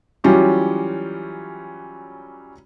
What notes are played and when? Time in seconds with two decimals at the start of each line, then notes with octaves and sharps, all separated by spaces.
0.24 E3 F#3 G3 C#4 F4 G4